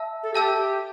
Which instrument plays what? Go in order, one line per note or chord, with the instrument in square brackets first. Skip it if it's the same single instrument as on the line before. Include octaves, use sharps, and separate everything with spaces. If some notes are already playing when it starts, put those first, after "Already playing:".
Already playing: [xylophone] E5 A5 E6
[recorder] A4
[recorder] G4 [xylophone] E5 A5 E6 G6
[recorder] G4